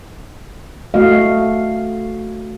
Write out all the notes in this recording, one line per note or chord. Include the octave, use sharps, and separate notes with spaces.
A3 F#4 D#5 F5